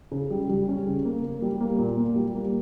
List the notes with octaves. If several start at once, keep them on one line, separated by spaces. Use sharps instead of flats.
C#3
G3
G3
C#4
C#3
A#3
A#3
G3
A#3
A#2
A#3
G3
A#3